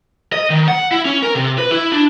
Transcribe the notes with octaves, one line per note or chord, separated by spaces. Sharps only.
D#5
D#3
F#5
E4
C#4
A#4
C3
B4
E4
D4